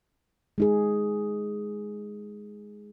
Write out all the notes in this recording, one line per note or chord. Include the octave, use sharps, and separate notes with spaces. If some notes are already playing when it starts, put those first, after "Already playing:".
G#3 D#4 G#4